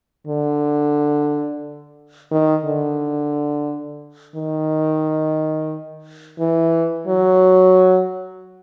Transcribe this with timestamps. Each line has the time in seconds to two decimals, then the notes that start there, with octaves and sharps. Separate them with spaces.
0.27 D3
2.32 D#3
2.66 D3
4.36 D#3
6.40 E3
7.08 F#3